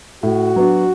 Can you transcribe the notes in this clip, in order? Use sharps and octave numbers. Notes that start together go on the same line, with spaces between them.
A2 F#4
F#3 B3 D4